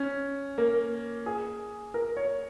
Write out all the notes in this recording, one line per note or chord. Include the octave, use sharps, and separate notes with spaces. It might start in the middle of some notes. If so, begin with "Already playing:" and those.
Already playing: C#4
A#3
G#4
A#4
C#5